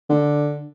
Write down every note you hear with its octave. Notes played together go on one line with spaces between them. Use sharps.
D3